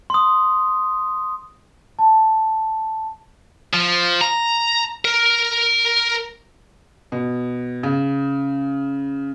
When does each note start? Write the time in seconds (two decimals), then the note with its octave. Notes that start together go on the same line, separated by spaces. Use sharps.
0.10 C6 D#6
1.99 A5
3.73 F3
4.21 A#5
5.05 A#4
7.12 B2
7.83 C#3